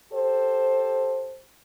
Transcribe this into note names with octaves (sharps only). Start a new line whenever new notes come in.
G4 A4 C5